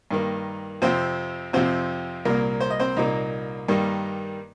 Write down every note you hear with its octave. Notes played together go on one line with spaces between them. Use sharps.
G2 D#3 A#3
F2 C3 F3 C4 C5
F2 C3 F3 C4 C5
C2 A#2 A#3 A#4
C5
D#5
C4 C5
C2 A#2 A#3 D#4
G2 D#3 G3 A#3